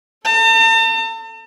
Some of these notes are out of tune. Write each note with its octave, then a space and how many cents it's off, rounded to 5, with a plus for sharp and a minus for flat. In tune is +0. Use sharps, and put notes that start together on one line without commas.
A4 +0 A5 +45